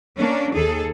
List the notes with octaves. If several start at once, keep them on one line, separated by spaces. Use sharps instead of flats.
A#3 C#4 D4
D#2 G#4 A4